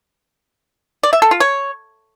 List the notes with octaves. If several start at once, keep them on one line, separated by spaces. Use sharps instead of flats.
D5
E5
A4
F4
C#5